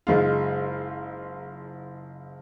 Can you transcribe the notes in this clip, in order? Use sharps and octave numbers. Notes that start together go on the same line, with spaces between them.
F#1 G#3 D#4 F4